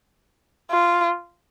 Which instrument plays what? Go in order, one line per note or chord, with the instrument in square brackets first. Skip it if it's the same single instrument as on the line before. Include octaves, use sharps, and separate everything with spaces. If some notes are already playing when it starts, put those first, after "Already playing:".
[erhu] F4